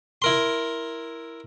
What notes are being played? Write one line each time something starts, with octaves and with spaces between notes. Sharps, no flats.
E4 A#4 C6